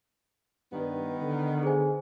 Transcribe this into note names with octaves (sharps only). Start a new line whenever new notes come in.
G2 D#3 B3
D3
G#4 C5 G#5